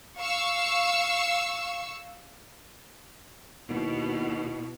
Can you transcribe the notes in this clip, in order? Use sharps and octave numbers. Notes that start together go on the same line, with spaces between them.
F5 C#6 E6
D#2 B2 E4